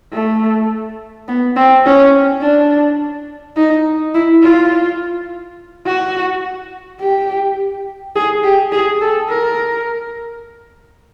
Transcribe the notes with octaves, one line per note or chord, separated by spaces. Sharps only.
A3
B3
C4
C#4
D4
D#4
E4
F4
F#4
G4
G#4
G4
G#4
A4
A#4